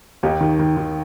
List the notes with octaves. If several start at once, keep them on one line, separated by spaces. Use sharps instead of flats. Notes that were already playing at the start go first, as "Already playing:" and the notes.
D#2 D#4 G4
D#3
D#3
D#3